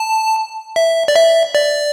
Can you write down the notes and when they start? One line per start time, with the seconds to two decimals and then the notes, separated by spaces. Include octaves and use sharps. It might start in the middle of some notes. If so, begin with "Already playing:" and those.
Already playing: A5
0.76 E5
1.08 D5
1.16 E5
1.55 D5